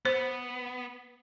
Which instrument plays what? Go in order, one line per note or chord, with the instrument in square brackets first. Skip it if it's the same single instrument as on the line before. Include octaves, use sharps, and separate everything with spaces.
[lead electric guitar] B3 [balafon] C5